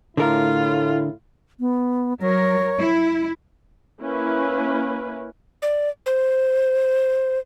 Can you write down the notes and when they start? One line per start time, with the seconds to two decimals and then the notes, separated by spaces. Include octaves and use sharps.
0.17 A2 D3 E4 F4 A#4
1.60 B3
2.22 F#3 A#4 C#5
2.78 E4
4.00 A#3 C#4 E4 B4
5.62 D5
6.06 C5